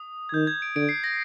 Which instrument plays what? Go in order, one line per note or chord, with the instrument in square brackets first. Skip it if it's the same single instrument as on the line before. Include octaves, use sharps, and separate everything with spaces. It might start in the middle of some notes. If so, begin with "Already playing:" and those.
Already playing: [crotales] D#6
G#6
[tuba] D#3 [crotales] G6
[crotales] G#6
D7
[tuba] D3 [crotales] D7
[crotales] C7
A#6